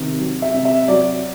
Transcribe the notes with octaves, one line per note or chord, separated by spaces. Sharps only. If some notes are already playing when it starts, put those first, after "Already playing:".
Already playing: C3 D#3
F#3
E5
C3
E5
F#3 D5